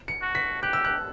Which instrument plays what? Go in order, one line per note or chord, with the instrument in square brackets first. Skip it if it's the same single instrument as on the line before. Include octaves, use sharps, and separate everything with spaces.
[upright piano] C#7
[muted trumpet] F#4
[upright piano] B6
[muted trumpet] G4 [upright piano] F#6
[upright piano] E6
F#6